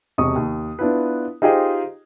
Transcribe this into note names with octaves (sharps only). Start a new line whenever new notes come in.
E1 C3 D#5 C#6 D#6
D#2
B3 D4 E4 F4 B4
D#4 F4 G4 G#4 C5 D#5